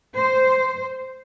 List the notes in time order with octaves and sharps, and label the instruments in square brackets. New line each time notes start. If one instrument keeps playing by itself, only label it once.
[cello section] C5